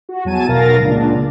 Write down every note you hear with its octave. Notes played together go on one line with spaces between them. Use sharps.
F#4
E2 F#3 G#5 A5 D#7
B1 B2 A#4 F5 A6 A#6
C#2 A#2 D4